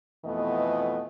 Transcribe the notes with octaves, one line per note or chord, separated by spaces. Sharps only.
F2 B2 E3 A3 B3 D#5